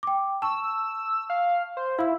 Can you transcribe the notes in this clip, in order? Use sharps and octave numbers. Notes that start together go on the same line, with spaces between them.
G5 D6
A5 C#6 E6
F5
C5
E4 F5 E6